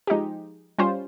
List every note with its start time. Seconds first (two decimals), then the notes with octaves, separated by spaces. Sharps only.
0.07 F3 G#3 D#4 G4
0.78 G3 C#4 F4 C5